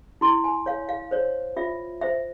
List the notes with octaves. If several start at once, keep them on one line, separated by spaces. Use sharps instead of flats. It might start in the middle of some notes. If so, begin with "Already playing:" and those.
E4 C6
G#5
C#5 F5
F5
C5 C#5
F4 E5
C5 E5